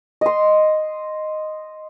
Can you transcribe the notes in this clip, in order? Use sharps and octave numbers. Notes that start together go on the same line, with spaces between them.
D#5 C6